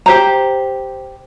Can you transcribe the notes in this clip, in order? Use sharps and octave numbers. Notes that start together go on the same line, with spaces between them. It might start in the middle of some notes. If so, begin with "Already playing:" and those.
G4 C5 A#5